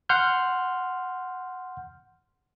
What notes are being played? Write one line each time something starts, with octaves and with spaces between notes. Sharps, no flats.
F#5 C6 F6 G6